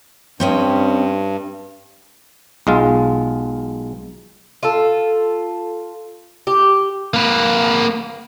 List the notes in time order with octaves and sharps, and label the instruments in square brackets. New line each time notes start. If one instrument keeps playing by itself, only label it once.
[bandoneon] G2 [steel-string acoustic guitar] C4 C#4 D#5
[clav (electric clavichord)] B1 G#3 F4
[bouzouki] F4 A4
G4
[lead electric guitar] A#3 B4